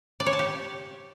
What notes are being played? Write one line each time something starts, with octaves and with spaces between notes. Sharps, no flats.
D5
C#5
A5
G4